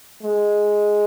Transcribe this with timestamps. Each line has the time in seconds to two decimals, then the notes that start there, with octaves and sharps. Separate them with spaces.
0.23 G#3